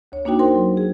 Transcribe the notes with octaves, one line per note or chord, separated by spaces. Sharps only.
D2 C#5
A#3 D4 D#4 F#4 G5
A#4 C5 G5 C6
F#3
G#4